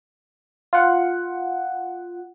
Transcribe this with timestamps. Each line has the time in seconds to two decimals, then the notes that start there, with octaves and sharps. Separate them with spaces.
0.73 F4 F#5